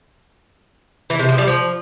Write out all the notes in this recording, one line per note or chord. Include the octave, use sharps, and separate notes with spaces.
E3
C3
F3
G3
F3